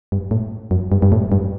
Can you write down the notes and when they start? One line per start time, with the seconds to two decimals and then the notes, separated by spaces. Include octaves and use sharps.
0.12 G2
0.31 A2
0.71 F#2
0.92 G2
1.02 G2
1.12 A2
1.32 G2